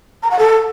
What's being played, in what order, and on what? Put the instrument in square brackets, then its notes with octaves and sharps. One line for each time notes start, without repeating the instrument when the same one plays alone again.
[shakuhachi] A#5
F#5
A4